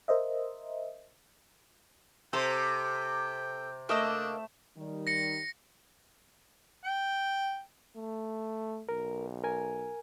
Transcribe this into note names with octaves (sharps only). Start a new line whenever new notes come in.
A#4 C5 D#5 E5
C3 A4 C5 G5
A3 A#3 D4 D#5 E5 E6
D#3 G3
A#6 C#7
G5
A3
B1 A#4
A#4 G#5